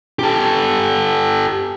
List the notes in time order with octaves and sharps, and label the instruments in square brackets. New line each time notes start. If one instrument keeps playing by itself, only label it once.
[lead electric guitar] G4 A4